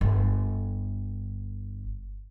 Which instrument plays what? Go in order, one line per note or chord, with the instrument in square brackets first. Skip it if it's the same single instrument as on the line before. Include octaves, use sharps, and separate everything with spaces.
[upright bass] G1 D3